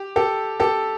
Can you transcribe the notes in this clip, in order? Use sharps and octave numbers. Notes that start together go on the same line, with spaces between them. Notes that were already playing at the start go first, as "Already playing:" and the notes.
Already playing: G4
G4 A4
G4 A4